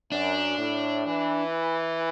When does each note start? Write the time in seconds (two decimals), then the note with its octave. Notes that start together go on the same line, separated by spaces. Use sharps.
0.11 F#2 D4
0.58 A2
1.05 E3